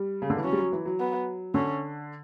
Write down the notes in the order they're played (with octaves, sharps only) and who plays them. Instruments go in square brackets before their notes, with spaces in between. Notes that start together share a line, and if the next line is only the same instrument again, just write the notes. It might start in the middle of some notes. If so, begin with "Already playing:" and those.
Already playing: [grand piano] G3
C#3
D3
E3
[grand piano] F#3 [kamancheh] C#4
[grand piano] G3
F#3
E3
F#3
[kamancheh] B3
[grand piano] D3 [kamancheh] C#4